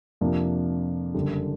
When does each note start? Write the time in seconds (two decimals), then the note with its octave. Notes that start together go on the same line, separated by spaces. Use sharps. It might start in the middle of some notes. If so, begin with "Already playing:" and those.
0.21 F2 C3 F3 A#3 D4
1.14 F#1 F#2 D3 G3